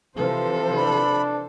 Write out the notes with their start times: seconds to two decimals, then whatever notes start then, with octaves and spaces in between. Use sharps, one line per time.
0.16 C3 E3 F3 A4 C5
0.76 D4 B5